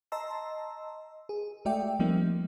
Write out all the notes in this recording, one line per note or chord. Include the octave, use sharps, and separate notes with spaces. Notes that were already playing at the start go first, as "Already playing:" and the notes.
D#5 A5 A#5 C6 E6
G#4
G#3 A3 F#4 D5 E5 G5
F3 G3 A3 A#3 C4 D#4